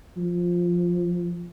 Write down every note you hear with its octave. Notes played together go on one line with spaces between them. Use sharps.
F3